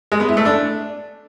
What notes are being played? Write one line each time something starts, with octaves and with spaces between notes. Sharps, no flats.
G#3
B3
E4
A3
D4